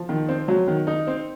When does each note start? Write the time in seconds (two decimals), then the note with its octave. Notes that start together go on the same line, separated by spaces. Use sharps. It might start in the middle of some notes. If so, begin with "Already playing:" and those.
Already playing: F3
0.09 D#3
0.29 C4
0.48 F#3
0.68 D#3
0.87 D#4
1.07 C4